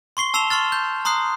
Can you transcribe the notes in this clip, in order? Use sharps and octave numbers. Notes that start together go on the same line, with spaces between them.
C6 C#6 C7 G7
A5 E6 C7 E7 F7 G7
C6 C#6 F6 A6
G6
A#5 C6 D#6 F#6 C7